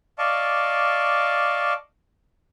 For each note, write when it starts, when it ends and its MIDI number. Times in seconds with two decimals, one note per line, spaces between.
0.18 1.73 74
0.18 1.73 75
0.18 1.73 77
0.18 1.73 81
0.18 1.73 85
0.18 1.73 86